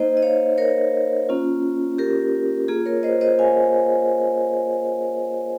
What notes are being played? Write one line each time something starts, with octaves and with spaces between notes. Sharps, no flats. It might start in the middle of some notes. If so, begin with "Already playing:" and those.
Already playing: A#3 D#4 C5 D#5
D#5
C#5 F5
A#4 C#5
A#3 C#4 F4
G4 A#4
A#3 F4 G#4
A#4 C#5
C5 D#5
C5 D#5
F5 G#5